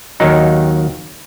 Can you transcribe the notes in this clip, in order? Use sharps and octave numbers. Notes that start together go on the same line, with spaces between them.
D#2 D#3 F#3 D#4